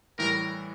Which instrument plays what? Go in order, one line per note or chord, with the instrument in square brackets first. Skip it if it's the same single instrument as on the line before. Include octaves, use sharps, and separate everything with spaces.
[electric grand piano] A2 E3 G3 [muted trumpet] A#4